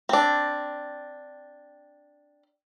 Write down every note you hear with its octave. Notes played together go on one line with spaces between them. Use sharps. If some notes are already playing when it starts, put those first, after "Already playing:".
C4 D4